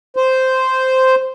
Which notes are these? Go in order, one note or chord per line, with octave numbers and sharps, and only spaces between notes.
C5